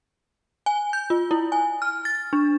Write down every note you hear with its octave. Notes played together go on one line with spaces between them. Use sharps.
G#5
G6
F4
E4
G#5
F6
A6
D4